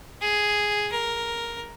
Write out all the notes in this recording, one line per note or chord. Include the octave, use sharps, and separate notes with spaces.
G#4
A#4